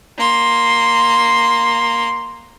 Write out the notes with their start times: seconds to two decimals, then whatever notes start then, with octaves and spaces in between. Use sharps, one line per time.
0.18 A#3 C6